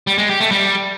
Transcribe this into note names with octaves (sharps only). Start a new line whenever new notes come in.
G3
G#3
G4
A3
G3